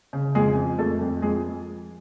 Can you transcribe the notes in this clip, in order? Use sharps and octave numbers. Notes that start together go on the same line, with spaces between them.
C#3
F2 G#3 G#4
F3
F2 A3 A4
F2
F3 G#3 G#4